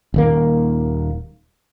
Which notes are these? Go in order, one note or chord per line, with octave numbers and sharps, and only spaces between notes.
D#1 D#2 A#3